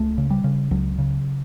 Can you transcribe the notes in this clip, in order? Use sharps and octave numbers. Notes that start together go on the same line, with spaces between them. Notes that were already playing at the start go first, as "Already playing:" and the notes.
Already playing: C#2 A3
C#3
G3
C#3
C#2 F#3
C#3